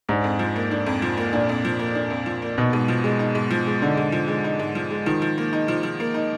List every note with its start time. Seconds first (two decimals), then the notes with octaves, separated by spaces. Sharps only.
0.09 G#2 D4
0.24 F2
0.39 F3
0.56 A#3
0.71 D4
0.87 F2
1.02 F3
1.17 A#3
1.33 A#2 D4
1.49 F2
1.65 F3
1.79 A#3
1.95 D4
2.10 F2
2.26 F3
2.42 A#3
2.58 B2 D#4
2.73 G#2
2.88 F3
3.04 G#3
3.19 D#4
3.35 G#2
3.50 F3
3.67 G#3
3.82 D3 D#4
3.97 G#2
4.12 F3
4.28 G#3
4.44 D#4
4.60 G#2
4.75 F3
4.90 G#3
5.06 D#3 F3
5.22 F3
5.38 A#3
5.53 D#4
5.68 F3
5.83 F3
6.00 A#3
6.14 D#4